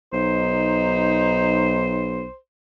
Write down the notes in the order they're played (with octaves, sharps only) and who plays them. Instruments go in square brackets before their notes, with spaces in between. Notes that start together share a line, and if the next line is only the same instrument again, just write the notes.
[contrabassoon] B1 [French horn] D#4 [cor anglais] C5